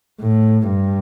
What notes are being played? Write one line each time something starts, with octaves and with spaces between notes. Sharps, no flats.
A2
G2